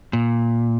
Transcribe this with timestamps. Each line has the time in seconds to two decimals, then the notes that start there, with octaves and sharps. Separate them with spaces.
0.13 A#2